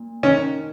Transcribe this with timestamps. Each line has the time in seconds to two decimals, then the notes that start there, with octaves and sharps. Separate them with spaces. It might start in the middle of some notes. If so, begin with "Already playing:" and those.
Already playing: A#2
0.23 D#3 C#4